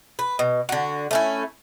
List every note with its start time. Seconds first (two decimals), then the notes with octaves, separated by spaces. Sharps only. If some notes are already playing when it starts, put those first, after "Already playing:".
0.19 B4
0.39 B2
0.69 D3 F#4
1.11 A3 C#4 E4